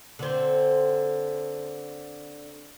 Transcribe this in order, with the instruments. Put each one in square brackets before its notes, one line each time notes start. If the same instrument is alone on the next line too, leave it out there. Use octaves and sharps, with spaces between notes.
[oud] D3 C4